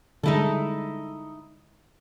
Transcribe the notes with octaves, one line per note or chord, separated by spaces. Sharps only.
D3 G3 G#3 D#4 E4 A4